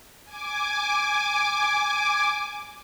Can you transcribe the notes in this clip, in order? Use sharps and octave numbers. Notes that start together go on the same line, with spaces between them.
G#5 D6